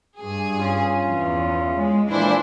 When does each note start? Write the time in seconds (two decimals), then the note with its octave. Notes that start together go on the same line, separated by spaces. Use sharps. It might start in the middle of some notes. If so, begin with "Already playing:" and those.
0.19 G2 G#4
0.59 C#4 F4
1.07 E2
1.78 G#3
2.09 A#2 E3 F3 D4 E4 C5